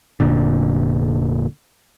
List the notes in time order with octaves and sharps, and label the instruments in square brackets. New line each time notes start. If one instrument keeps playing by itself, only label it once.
[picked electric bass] F1 A#2 D3